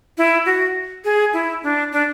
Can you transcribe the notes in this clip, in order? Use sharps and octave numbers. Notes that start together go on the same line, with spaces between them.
E4
F#4
G#4
E4
D4
D4